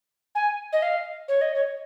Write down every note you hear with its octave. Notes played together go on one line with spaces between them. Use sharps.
G#5
D#5
F5
C#5
D#5
C#5